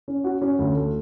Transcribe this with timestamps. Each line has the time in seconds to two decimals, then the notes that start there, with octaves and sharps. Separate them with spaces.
0.08 C#4
0.24 F#4
0.42 C#4
0.59 D2
0.75 A3